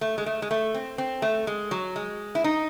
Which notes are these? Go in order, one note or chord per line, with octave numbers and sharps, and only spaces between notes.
A3
G#3
A3
G#3
A3
C4
C4
A3
G#3
F#3
G#3
E4
D#4